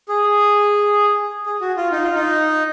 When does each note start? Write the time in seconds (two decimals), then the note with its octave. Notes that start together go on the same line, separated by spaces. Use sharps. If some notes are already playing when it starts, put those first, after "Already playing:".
0.09 G#4
1.46 G#4
1.61 F#4
1.77 F4
1.92 D#4
2.03 F4
2.15 D#4